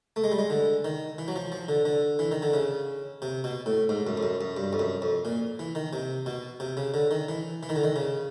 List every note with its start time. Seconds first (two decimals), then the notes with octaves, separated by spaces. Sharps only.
0.16 A3
0.24 G#3
0.32 G3
0.39 G#3
0.50 D3
0.85 D#3
1.18 E3
1.28 F#3
1.36 F3
1.52 F3
1.68 D3
1.85 D3
2.19 E3
2.31 D#3
2.42 D3
2.53 C#3
3.22 C3
3.44 B2
3.66 A2
3.89 G#2
4.07 F#2
4.17 F2
4.23 F#2
4.41 F#2
4.57 G2
4.73 F2
4.79 F#2
5.02 F2
5.25 A#2
5.59 E3
5.75 D#3
5.93 C3
6.26 B2
6.60 C3
6.77 C#3
6.94 D3
7.11 D#3
7.29 E3
7.63 E3
7.69 D#3
7.76 D3
7.84 D#3
7.96 C#3